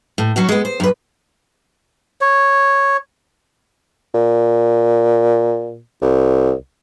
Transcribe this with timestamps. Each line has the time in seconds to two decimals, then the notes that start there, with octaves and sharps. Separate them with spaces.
0.18 A2
0.36 F#3 C#4 F#4
0.49 G#3 B3
0.65 C5
0.80 F#2 B4
2.21 C#5
4.14 A#2
6.02 C2